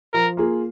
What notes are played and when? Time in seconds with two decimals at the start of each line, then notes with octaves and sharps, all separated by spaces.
0.14 F3 A#4
0.37 A#3 F4 G#4